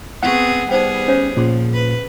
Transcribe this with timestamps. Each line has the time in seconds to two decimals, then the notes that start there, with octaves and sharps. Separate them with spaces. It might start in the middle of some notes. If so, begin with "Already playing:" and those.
0.23 B3 C4 G#4 F5 F#5 C#6
0.69 G3 B3 D#4 G#4 C5 G5
1.08 C#4 C5 C#5 F5
1.37 A#2 F3 C#4 G#4 C6
1.73 B4